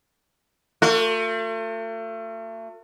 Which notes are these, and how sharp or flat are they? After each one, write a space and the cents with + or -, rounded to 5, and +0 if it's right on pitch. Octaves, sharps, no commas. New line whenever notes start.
A3 +40 F#4 -45